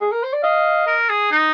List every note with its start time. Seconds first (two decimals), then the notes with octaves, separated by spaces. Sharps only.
0.01 G#4
0.12 A#4
0.23 C5
0.33 D5
0.43 D#5 F5
0.87 A#4
1.09 G#4
1.31 D#4